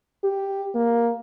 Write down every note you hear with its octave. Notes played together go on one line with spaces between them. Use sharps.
G4
A#3